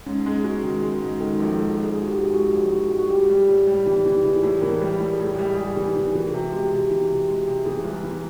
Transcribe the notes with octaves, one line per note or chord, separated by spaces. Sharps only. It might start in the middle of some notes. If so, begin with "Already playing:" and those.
G#2 C#4
G#3
G#3 F#4
D#3
G#3
G#2
D#3 A4
A#1
G#3 A4
A#1
G#4
G#2
F#4
G4
G#2
G#3 F#4
A#1
G#2 F#4
G#3
F#4
G3 G4
G3
A2
G3
E3 G4
E3
E3 G#4
A2
E3 A#4
G3
A2
G#4
A2
G3 G#4
G3 G#4
G4
E3
E3
E3 F#4
C3
G#3 G4
C3
E3
C3
G#3
C3
E3 G#4
C2
E3